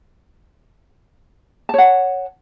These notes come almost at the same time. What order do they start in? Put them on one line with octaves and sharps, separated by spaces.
A5 C#5 F#5